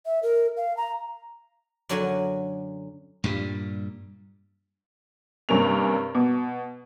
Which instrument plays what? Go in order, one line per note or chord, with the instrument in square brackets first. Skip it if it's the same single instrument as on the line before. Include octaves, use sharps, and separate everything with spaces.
[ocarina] E5
A#4
F5
A#5
[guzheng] F#2 D3 F#3 C#4 D5 G#5
[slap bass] G2 A#2 G3
[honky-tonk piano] G2 C3 A#3 C#4 A#4 F7
B2